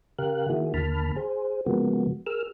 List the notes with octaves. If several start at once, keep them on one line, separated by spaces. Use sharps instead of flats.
C#3 G4 A#4 F5 F#6
D#3 A#3 E4 F#4 G#4
D#2 D3 A#3 A5 B5 F6
G#4 C5
C#3 F3 G#3 A#3 B3 F#4
G#4 A#4 E6 F6